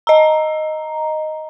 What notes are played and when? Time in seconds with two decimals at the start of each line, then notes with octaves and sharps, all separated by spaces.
0.07 D#5 A#5